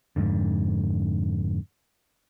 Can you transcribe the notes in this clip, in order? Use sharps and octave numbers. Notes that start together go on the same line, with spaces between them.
F2 G#2 D3